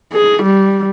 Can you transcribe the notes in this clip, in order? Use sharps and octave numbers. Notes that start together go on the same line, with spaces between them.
G#4
G3